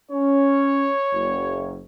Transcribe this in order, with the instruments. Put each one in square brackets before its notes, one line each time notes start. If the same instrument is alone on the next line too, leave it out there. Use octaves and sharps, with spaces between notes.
[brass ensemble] C#4 [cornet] C#5
[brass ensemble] F#1